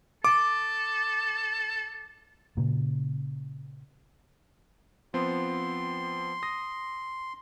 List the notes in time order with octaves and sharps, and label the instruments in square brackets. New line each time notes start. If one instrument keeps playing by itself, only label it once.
[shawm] A4 [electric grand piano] D6
[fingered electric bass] A#2 C#3 A#3
[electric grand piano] F3 B3 C4 [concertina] C6
[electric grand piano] D#6 A#6